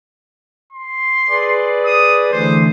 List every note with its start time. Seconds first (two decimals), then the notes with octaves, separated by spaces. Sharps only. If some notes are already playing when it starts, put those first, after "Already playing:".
0.72 C6
1.29 G#4 B4 D5
1.85 D#6
2.32 D3 E3 A3 C5